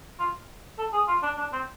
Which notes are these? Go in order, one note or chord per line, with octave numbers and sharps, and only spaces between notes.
F4
A4
G#4
F4
D4
D4
C4